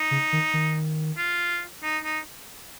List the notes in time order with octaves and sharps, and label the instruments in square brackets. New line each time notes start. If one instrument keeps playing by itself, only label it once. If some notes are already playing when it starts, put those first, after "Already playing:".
Already playing: [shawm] D#4
[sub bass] C#3
D#3
D#3
[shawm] F4
D#4
D#4